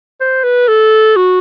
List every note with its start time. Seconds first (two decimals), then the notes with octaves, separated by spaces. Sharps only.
0.21 C5
0.44 B4
0.68 A4
1.17 F#4